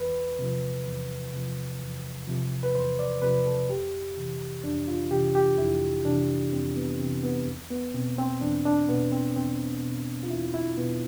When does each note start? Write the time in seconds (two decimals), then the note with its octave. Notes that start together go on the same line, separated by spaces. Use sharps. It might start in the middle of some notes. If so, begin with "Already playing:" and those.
Already playing: E2 B4
0.39 C3 F3
0.86 E2
1.33 C3 F3
1.81 E2
2.27 C3 F3
2.63 B4
2.75 E2 C5
2.99 D5
3.22 C3 F3 B4
3.46 A4
3.70 F2 G4
4.17 C3 E3
4.63 F2 D4
4.88 F4
5.11 C3 E3 G4
5.35 G4
5.58 F2 E4
6.05 C3 E3 D4
6.52 F2 C4
6.76 B3
7.00 C3 E3 C4
7.24 B3
7.47 E2
7.70 B3
7.94 B2 C4
8.18 C4
8.41 E2 D4
8.65 D4
8.89 B2 B3
9.12 C4
9.36 E2 C4
9.83 B2
10.23 F4
10.30 E2 E4
10.54 E4
10.77 B2 B3